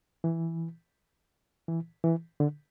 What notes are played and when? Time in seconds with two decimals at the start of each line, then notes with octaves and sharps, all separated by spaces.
0.24 E3
1.68 E3
2.04 E3
2.40 D3